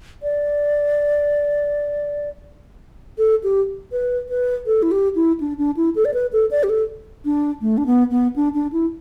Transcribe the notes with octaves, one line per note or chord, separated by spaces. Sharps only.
D5
A4
G4
B4
B4
A4
E4
G4
E4
D4
D4
E4
A4
D5
B4
A4
D5
G4
A4
D4
A3
D4
B3
B3
D4
D4
E4